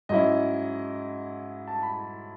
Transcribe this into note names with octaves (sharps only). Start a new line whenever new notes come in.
G#2 F#3 C#4 E4 D#5
A5
B5